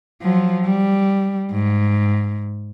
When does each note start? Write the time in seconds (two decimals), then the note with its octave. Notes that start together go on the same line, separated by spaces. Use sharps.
0.21 F3 F#3
0.65 G3
1.51 G#2